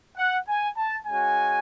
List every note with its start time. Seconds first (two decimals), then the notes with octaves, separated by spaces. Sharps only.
0.17 F#5
0.47 G#5
0.77 A5
1.06 G#3 C#4 F#4 G#5